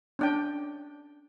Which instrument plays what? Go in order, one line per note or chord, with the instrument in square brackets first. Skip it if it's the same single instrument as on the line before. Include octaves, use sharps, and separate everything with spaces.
[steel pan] C#4 D4 G5